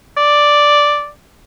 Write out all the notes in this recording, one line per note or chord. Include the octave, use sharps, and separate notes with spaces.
D5